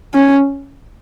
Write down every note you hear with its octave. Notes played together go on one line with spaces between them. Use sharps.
C#4